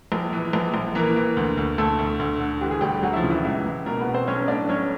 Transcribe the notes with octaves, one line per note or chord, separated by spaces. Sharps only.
A#1
E3
A#1
A#1
E3 A#3 A#4
E3
D2
D2
D2 A3 A4
D2
D2
D3
E3 G4
G#4
D2 G3 G4
D2 F#3 F#4
E4
F3 F4
C#3
E3 E4
C#2 E3 E4
C#2
B2 A#3 A#4
B3 B4
B2
C4 C5
B1 C#4 C#5
A2 D4 D5
B1 C#4 C#5